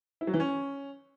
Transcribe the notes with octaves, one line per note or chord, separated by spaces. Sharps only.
E4
F#3
E3
C#4